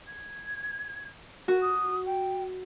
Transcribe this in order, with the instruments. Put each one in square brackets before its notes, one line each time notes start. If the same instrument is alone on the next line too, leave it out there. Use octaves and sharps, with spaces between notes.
[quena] G#6
[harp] F#4 [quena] A#4
[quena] D#6
G5